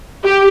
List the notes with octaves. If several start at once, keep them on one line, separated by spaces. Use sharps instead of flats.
G4